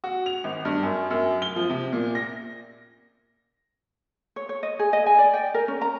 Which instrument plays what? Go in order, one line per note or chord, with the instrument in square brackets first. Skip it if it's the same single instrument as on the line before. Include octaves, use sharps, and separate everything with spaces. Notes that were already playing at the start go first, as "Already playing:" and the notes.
[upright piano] F#4
F7
G#1
G2
F#2
F#2
G7
F3
C3
A#2
A#6
[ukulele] C#5
C#5
D#5
G#4
D#5
G#5
D5
G5
A#4
C#4
A#5